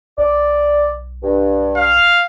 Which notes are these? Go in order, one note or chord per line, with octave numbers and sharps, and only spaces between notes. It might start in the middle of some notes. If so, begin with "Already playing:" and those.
B1 D5
G2
F5